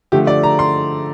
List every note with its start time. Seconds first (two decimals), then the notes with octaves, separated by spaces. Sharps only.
0.12 D3 F3 A3 G4
0.27 D5
0.43 A#5
0.59 C6